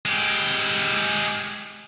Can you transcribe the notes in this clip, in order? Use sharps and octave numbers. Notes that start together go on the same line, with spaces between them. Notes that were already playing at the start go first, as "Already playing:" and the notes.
G#3 G4